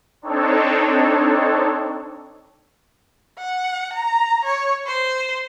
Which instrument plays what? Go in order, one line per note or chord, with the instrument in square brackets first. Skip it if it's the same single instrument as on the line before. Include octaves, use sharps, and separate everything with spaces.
[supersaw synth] C4 D4 D#4 A4 C#5
[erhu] F#5
A#5
C#5
C5